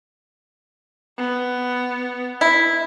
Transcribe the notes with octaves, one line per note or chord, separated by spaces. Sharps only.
B3
E4